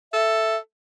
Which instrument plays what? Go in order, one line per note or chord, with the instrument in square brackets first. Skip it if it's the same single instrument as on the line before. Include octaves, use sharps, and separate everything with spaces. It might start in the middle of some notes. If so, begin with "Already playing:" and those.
[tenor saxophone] A4 [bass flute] E5